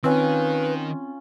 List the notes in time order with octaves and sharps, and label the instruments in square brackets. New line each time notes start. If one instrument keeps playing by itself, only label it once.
[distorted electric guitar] D#3 [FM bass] C4 [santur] C#4 F4 [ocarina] B4